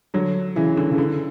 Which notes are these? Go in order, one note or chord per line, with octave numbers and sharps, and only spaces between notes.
D3 F#3
C#3 E3
D3
C#3
D3